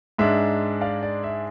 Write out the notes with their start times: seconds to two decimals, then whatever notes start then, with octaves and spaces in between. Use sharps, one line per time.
0.18 G#2 G#3 D4 E5
0.81 D5 F5
1.03 D5
1.24 E5